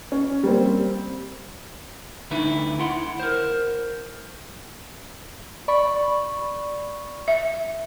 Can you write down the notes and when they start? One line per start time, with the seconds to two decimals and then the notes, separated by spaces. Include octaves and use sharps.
0.12 C#4
0.43 G3 A#3 C4
2.31 D2 D3 D#4 E4 B4
2.79 D2 E4 F#5 C6
3.20 A#4 C5
5.68 D5 B5 C#6
7.28 E5